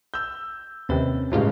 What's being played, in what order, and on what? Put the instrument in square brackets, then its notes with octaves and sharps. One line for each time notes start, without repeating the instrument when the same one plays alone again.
[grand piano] E6 G6
[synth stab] D#2 C3 D#3 [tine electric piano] C4 C#4 B4
[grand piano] G1 C#3 F5 [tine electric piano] A2 G#3 [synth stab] F#3 F4 G4